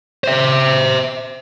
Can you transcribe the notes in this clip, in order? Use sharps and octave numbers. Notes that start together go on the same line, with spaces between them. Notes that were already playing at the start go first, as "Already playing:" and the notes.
C5 E5